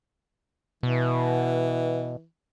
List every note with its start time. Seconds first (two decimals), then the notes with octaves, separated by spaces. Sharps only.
0.83 B2 E3